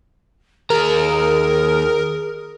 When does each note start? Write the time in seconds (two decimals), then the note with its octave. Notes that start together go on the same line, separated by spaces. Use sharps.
0.70 D#2 G#4 A#4 A#5